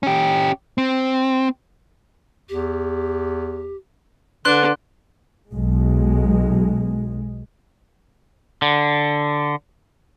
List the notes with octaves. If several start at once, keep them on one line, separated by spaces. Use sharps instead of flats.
C#4 G4
C4
E2 G4
D3 D4 B4 C6 F#6
B1 G#3
D3